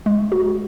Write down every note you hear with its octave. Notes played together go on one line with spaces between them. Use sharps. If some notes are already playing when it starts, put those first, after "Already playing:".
G#3
F#4